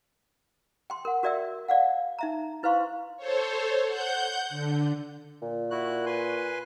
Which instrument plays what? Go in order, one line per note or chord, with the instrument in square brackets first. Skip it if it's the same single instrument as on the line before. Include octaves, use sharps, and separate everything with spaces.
[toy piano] G5 C6
A#4 F#5
F#4 A#4 D5 E5 G5 E6
D5 F5 F#5
D#4 E5 A#5
E4 B4 C5 F5 C6 C#6
[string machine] A4 C5 C#5
F#5 G6
D3
[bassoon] A#2
[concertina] E4 F#4 F#6
B4 G#5 C6